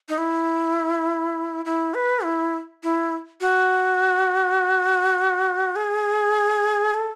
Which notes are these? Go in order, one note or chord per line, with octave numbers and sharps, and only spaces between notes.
D#4
E4
E4
B4
E4
E4
F#4
G#4
A4